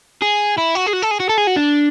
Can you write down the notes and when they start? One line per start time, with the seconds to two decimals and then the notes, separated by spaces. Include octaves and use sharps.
0.22 G#4
0.58 E4
0.75 F#4
0.86 G#4
0.93 F#4
1.02 A4
1.11 G#4
1.20 F#4
1.29 A4
1.38 G#4
1.47 F#4
1.56 D4